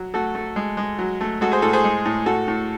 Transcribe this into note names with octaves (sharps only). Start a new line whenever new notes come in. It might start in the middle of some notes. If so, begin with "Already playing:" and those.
Already playing: F#3
A3 F#4 A4
A3
G#3
G#3
F#3
A3
G#3 F#4 A4
G#4 C5
A2 F#4 A4
G#4 C5
G#3
A2
A2 F#4 A4
A2